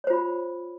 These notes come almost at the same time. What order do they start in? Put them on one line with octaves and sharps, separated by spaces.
C#5 C5 F4 B5